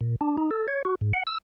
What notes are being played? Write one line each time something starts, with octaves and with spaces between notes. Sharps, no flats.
A#2
D4
D#4
A4
C#5
F#4
G#2
F#5
E6